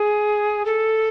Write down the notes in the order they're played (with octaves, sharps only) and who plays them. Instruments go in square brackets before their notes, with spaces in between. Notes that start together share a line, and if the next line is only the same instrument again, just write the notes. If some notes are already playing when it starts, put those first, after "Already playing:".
Already playing: [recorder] G#4
A4